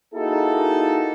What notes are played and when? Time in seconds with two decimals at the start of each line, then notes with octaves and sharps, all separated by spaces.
0.14 A#3 D#4 E4 F#4 G#4 A4